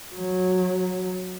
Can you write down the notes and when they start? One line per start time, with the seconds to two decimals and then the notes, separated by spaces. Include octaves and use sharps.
0.15 F#3